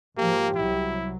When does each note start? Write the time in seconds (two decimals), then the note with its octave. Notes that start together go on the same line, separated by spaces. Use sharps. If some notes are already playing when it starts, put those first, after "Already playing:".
0.18 G#2 F3 A#3 G4
0.56 C2 F#3 E4